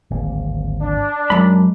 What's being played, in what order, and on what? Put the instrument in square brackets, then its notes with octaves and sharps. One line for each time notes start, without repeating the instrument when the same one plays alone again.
[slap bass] D1 G#1 A#3
[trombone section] D4
[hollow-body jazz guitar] F#2 B5 [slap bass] G#3